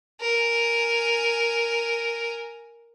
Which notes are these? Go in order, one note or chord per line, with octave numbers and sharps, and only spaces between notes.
A#4 G#5